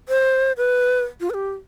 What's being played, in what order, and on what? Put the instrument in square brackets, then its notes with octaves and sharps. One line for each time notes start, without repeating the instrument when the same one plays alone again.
[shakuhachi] C5
B4
F4
B4
G4